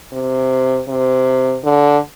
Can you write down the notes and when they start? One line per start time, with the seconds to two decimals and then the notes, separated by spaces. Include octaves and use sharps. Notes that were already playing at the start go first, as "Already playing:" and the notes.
0.13 C3
0.88 C3
1.64 D3